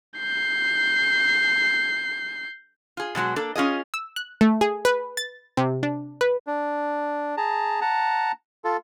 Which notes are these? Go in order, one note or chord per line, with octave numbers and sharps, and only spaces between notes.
G6 C7
F4 G#4
B2 F#3 G#3 F#4
A#3 D4 A4
C#4 F4 G#4 D#5
E6
F#6
A3
G#4
B4
A6
C3
D4
B4
D4
G#4 A5 A#5
F#5 A5 A#5
F4 A4